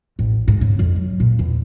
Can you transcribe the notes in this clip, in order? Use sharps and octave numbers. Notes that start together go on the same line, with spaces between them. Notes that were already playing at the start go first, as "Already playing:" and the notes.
A1
G#2
C#3
F2
F#3
A#2
E2